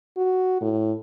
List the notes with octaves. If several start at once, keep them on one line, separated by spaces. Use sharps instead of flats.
F#4
A2